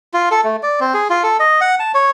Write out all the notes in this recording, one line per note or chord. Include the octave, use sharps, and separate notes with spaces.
F4
A4
A3
D5
C4
G#4
F4
A4
D#5
F#5
A5
C#5